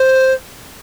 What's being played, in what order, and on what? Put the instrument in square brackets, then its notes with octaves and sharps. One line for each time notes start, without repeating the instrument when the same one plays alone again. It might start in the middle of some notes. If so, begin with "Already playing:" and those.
Already playing: [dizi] C5